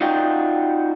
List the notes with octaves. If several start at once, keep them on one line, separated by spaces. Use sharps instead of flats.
D#4 F4 F#4 D5 G5